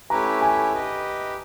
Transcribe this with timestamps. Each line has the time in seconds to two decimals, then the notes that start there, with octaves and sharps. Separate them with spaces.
0.10 A3 C#4 E4 G4 B4 A#5
0.41 G#5
0.73 G4 B4 D#5